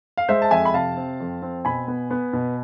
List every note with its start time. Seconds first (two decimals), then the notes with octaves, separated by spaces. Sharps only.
0.17 F5
0.29 G#3 C5 E5
0.42 A5
0.51 F2 E5 G#5
0.65 B5
0.74 C3 F5 A5
0.96 C4
1.20 F2
1.42 C4
1.65 B2 G#5 B5
1.88 B3
2.10 B3
2.33 B2